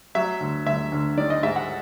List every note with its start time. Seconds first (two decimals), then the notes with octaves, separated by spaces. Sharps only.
0.15 F#3 E5
0.40 D2
0.66 D2 E5
0.92 D2
1.17 D#3 D5
1.30 D#5
1.43 G#2 E5
1.56 F#5